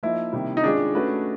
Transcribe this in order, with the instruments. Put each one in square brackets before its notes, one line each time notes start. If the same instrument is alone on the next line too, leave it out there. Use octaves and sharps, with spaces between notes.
[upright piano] F3 A#3 D#4 [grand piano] E4
[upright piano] C3 D#3 G3 A#3
[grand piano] D#4
[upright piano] D#3 G#3 C#4 F4 G#4 [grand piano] D4
[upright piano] A3 C#4 F#4 B4